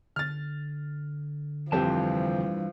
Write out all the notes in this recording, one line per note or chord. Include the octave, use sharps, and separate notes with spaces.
D3 F6 A6
F1 G2 E3 F3 C4 G4 A5